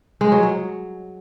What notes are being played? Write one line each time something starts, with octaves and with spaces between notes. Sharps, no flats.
G#3
F#3
F#3